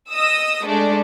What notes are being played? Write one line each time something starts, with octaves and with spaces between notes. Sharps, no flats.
D#5 D#6 E6
G#3 A3 D4